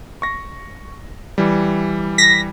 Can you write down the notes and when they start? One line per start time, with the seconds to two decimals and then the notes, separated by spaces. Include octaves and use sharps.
0.22 C#6 A#6
1.38 E3 G3
2.18 A#6 B6